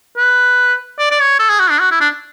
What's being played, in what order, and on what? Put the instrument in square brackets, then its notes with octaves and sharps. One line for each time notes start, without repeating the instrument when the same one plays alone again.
[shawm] B4
D5
D5
C#5
A4
G#4
F#4
D4
F#4
E4
D4